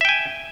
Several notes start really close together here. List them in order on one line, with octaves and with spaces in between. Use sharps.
E5 G5 G#5